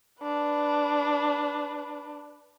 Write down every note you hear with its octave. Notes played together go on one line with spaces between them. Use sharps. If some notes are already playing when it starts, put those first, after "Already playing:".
D4 B4